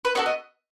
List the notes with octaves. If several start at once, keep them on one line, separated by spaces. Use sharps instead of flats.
B4
B3 F#4 A4 C#5
D#5